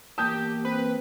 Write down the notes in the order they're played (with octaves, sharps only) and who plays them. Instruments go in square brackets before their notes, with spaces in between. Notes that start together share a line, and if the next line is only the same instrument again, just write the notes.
[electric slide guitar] E2 A#3 A5 [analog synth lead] G4 [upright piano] D#6 G6
[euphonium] C4 [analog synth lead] B4